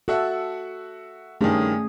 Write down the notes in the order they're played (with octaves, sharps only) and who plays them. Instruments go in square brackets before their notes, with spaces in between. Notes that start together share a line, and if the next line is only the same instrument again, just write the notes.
[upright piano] F#4 E5 F#5 [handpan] A4
[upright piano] G2 D#3 [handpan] A3 C#4 G#4